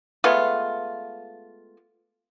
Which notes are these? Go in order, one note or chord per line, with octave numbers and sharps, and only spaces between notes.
G#3 A3 B3 F4